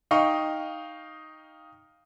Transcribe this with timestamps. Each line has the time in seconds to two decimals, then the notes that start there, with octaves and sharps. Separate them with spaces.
0.11 D#4 D#5 F5 G5 C#6